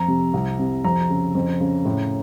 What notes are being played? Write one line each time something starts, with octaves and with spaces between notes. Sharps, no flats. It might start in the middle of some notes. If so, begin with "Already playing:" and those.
Already playing: F2 A#5
C3
C2
C3
F2 A#5
C#3
F2
C#3
A2